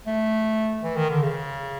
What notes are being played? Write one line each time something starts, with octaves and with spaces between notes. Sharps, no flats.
A3
E3
D#3
D3
C#3